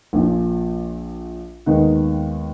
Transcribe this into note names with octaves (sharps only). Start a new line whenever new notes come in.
A#1 A#2 F3
D#2 D#3 G#3 B3 D#4